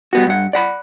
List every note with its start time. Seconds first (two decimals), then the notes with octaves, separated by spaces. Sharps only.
0.13 G3 B3 F#4
0.27 G2 F#5
0.53 D5 F#5 B5